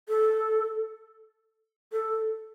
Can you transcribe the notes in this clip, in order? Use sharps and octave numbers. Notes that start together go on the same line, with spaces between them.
A4
A4